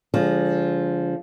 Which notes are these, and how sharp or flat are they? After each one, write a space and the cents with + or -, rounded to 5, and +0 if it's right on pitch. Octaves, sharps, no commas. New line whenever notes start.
D3 -35 F3 +0 G#3 -15